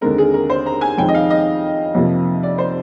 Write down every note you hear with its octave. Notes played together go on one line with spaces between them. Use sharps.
D#2 D3 G#3 C4 A#4
G#4
A#4
C5
A#5
G#5
F2 D#3 G#3 C4 G5
D#5
F5
D#5
F2 C3 F3 A#3
D5
C5